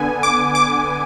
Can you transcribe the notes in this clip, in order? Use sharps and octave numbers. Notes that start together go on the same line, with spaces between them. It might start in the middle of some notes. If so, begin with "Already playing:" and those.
Already playing: D3 B3 G#5
D6
D6